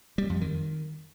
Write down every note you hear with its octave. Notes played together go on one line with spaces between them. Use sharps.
G3
F2
D#3